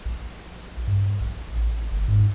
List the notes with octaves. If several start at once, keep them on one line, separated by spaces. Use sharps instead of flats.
A#1
G2
A#1
A1
G1
G#2